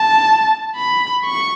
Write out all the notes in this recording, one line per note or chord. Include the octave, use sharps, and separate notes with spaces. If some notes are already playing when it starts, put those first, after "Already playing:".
Already playing: A5
B5
C#6